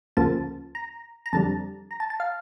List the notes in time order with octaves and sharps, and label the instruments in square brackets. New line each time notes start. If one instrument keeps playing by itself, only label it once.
[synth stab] D2 C#3 F3 A#3 A5
A#5
A#5
F2 D3 G3 A5
A#5
A5
A5
F5